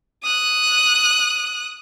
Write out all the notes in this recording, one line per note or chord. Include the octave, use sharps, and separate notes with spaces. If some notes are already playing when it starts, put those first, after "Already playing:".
D#6 F#6